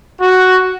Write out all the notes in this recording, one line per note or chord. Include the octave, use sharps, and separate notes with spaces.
F#4